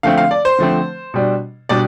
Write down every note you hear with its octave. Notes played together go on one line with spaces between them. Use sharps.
D3 F3 A3 C4 F5
F5
D5
C5
D3 F3 A3 C4
B2 G3 D4
B2 G3 D4 D5